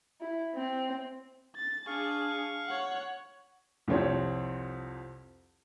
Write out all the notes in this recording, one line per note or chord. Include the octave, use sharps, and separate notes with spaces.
E4
C4
A6
D4 G#4 F5 C#6
C#5 F#5
C2 F2 C4 C#5